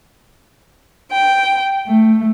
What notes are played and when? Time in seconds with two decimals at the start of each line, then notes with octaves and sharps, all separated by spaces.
1.13 G5
1.87 A3